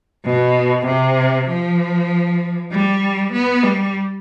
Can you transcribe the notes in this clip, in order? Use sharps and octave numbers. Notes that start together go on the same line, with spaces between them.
B2
C3
F3
G3
B3
G3